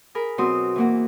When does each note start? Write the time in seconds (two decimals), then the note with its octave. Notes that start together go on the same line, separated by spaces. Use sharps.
0.15 G#4 A#4 B5
0.38 B2 F#3 C4 F#4 C6 D#6
0.76 E3 A#3 F#4